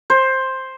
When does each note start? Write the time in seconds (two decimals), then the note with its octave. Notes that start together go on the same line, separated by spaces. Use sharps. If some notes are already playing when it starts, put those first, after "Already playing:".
0.10 C5